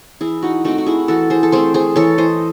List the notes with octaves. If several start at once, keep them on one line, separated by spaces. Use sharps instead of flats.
E3 E4 G#4
D#4 F#4
A3 C4 D#4 F#4
F#4
E4 G#4
E3 F#4 A4
G#4 C5
A4
A3 C4 G#4 C5
G#4 C5
E3 A4 C#5
C5 D#5